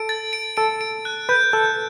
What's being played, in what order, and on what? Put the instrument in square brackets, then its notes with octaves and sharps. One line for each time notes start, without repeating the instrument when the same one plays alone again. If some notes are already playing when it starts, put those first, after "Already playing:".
Already playing: [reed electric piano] A4 [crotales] D7
[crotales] A6
D7
[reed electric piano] A4 [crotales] D7
[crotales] D7
F#6
[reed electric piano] B4 [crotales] G6
[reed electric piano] A4 [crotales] G6